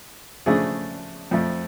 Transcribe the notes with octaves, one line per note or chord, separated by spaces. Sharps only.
C#3 F3 A3 D4 G#4
F2 F3 A3